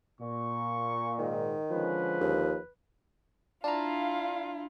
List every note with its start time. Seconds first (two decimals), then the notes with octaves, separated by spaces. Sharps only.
0.21 A#2 C#6
1.19 G#2 D#3
1.71 D3 F3 G#3 C#4 B4
2.20 D#2
3.64 D4 E4 F4 F5 A5 A#5